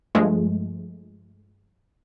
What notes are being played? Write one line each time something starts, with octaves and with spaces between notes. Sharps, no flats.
G2 F3 G#3 A3